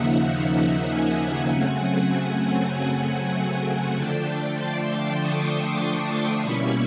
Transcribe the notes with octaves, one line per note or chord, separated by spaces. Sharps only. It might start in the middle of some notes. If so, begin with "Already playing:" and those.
Already playing: D#2 C#3 F3 A#3 D#4 E5 F#5
F#5 G#5
F#2 C#3 F#3 A3 C4
D3 F3 A3 D4 G5 A5
G5 A5
C6 D6
C#6 D#6
B2 G3 A#3 C#4 E4 B5 C#6